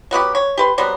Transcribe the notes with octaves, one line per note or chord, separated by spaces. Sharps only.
F#3 B3 F#4 G4
C#5
G4 B4 C6
F#3 G3 B3 C4